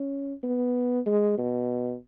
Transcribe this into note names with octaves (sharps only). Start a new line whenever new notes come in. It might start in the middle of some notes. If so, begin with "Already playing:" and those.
Already playing: C#4
B3
G#3
B2